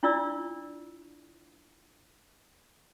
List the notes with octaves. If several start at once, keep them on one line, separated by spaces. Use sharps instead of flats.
D4 E4 F4 D5 E6